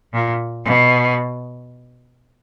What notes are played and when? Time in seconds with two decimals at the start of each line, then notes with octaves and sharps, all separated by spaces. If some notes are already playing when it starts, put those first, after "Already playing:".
0.14 A#2
0.65 B2